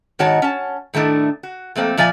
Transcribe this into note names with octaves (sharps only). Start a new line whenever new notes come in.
G#2 D#3 F#4 C#5 A5
C#4 A5
A2 D#3 A3 D4 E4
F#4
F2 A3 A#3 C4
A#2 F3 D5 E5 G#5